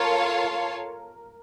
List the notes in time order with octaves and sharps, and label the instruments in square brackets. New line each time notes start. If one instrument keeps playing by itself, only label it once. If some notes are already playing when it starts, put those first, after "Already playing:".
Already playing: [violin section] F4 A4 C#5 F5 A5 [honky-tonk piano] A#4